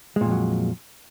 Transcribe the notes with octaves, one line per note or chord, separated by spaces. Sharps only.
F2 A#2 F#3 G#3